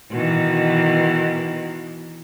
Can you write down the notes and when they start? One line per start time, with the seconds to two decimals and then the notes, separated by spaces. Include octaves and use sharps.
0.10 B2 D#3 E3